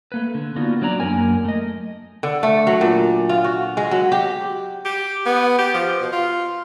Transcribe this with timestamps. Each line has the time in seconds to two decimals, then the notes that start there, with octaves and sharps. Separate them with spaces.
0.12 A3 A#3 B4
0.34 D3
0.56 A#3 B3 D4 D#4 F4 F#4
0.82 F#3 D4 D5 A#5
1.00 F#2 C#3 A#3 A#4 G#5
1.45 A3 D#5
2.23 D3
2.43 A3
2.67 F#3
2.81 A#2
3.29 F4
3.44 F#4
3.77 G#3
3.91 F#3
4.12 G4
4.85 G4
5.26 B3
5.59 G4
5.74 F3
6.01 B2
6.12 F4